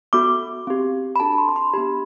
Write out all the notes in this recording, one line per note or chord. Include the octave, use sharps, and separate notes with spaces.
B3 F#4 A4 D6
C4 G4
B5
D4 F#4 A4 A5
C6
B5
C6
B3 D4 G4 B5